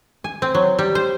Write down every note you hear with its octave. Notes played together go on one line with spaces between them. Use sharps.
G#5
C4
F#3
G3
C5